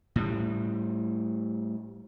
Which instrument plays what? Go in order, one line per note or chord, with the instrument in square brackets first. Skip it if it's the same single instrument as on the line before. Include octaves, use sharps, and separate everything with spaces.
[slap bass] A2 G3